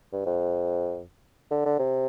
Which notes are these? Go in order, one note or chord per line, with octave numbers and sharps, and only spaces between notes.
G2
F2
D3
D3
C3